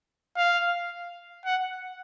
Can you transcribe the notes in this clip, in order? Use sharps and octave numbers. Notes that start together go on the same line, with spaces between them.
F5
F#5